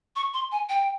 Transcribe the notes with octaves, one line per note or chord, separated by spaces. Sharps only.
C#6
C6
G#5
G5